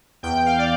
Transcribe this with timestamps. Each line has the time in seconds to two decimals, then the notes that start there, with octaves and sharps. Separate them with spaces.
0.23 E2 G5
0.46 F5
0.59 D5